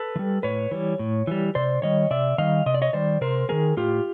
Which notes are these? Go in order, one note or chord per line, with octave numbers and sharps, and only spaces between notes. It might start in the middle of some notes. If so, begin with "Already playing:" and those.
Already playing: A4 B4
E3
G3
A2 B4 C#5
E3 G3
A2
E3 G3
C3 C5 D5
D#3 G3 C#5 D#5
C3 D5 E5
D#3 G3 D#5 F5
C3 D#5
D5
C#5 D#5
D#3 G3 C5 D5
C3 A#4 C5
D#3 G3 G#4 A#4
A2 F4 G4